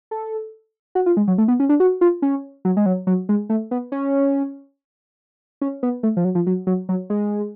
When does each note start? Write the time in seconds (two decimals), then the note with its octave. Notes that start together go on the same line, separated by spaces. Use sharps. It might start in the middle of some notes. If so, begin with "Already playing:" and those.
0.11 A4
0.95 F#4
1.06 F4
1.17 G#3
1.28 F#3
1.38 A3
1.48 B3
1.60 C#4
1.69 D4
1.80 F#4
2.01 F4
2.22 C#4
2.65 F#3
2.77 G#3
2.86 F#3
3.07 F#3
3.29 G#3
3.49 A3
3.71 B3
3.92 C#4
5.61 C#4
5.83 B3
6.03 A3
6.17 F3
6.24 F#3
6.35 F3
6.47 F#3
6.67 F#3
6.89 F#3
7.10 G#3